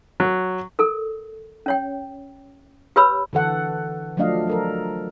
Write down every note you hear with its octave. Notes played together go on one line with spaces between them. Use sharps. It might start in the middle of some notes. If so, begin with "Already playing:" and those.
F#3
A4 A#4
C#4 C#5 G5
G4 B4 C#5 B5 E6
D3 E3 A4 F#5
F3 F#3 A3 D4 D#5 F5
F#3 A4 A#4